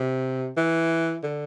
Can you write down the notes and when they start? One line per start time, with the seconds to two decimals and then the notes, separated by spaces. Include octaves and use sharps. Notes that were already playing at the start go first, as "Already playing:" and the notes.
Already playing: C3
0.57 E3
1.24 D3